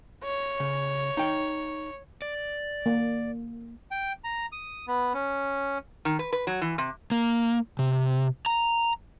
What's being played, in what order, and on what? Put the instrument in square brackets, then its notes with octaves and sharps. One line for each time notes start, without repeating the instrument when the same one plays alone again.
[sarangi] C#5
[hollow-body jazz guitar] C#3
D#4 G5
[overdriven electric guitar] D5
[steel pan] A#3
[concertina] G5
A#5
D#6
B3
C#4
[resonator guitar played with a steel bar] D#3
B4
B4
F#3
E3
C3
[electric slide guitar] A#3
C3
A#5